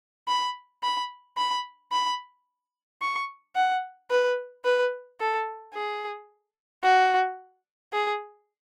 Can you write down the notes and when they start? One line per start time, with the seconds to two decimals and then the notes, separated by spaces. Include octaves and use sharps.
0.28 B5
0.83 B5
1.37 B5
1.92 B5
3.02 C#6
3.55 F#5
4.10 B4
4.65 B4
5.19 A4
5.74 G#4
6.83 F#4
7.93 G#4